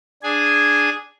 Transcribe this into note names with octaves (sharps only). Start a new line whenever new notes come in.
D4 G#4 G#5